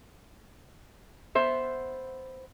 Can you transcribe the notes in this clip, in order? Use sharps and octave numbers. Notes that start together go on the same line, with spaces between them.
B3 C5 E5